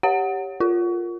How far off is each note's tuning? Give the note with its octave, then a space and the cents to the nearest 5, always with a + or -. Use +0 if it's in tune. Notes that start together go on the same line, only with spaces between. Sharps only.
G4 +0 C#5 +0 F#5 +0
F4 +0 A#4 +0